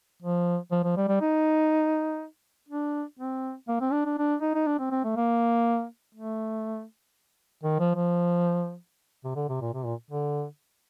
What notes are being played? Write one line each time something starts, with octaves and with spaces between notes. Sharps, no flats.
F3
F3
F3
G3
G3
D#4
D4
C4
A#3
C4
D4
D4
D4
D#4
D#4
D4
C4
C4
A3
A#3
A3
D#3
F3
F3
C3
D3
C3
A#2
C3
A#2
D3